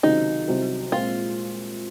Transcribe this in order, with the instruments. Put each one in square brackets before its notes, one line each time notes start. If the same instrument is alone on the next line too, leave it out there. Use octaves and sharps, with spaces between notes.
[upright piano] C#2 C3 D#3 F#3 [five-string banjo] D#4
[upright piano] C2 C3 F#3
[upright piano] A#2 G#3 C4 [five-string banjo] F4